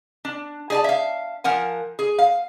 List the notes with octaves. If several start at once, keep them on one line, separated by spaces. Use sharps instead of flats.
D4
G#4 D5 A5
E5 F5
F3 A#4 F#5 G#5
G#4
F5